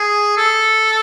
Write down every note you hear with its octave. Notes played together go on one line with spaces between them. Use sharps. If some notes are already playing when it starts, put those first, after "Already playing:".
Already playing: G#4
A4